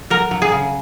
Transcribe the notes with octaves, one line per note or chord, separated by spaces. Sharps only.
F#3 A#4
F#3
G#4
C#3